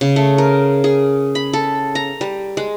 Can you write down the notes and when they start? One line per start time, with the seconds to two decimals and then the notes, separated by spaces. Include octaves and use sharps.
0.01 C#3
0.16 A3
0.38 A#4
0.84 G#4
1.35 B5
1.53 A4
1.95 A#5
2.21 G3
2.57 G#3